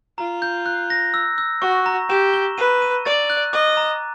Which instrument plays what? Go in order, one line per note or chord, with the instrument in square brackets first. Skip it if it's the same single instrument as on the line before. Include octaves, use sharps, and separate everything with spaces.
[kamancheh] F4 [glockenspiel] A#5
[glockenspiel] G6
F#6
A#6
E6
E6
[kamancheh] F#4 [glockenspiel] C#6
[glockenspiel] A#5
[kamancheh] G4 [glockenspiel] E7
[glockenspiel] G7
[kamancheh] B4 [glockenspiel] D#7
[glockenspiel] D#7
[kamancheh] D5 [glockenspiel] A6
[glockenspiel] F#6
[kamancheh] D#5 [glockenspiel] D6
[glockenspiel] A#5